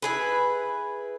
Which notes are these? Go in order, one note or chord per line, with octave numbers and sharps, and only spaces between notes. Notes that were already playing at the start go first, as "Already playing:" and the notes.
E4 G#4 B4